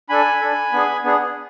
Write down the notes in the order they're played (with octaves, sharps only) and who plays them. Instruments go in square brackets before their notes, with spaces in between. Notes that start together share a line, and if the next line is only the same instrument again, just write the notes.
[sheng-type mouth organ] D4 A4 G#5 B5
D4 A4
B3 D4 G#4
B3 D4 G#4